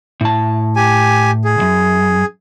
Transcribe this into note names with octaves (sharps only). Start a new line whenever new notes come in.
A2 A5
G4 G#5
G#4
C#2 F#2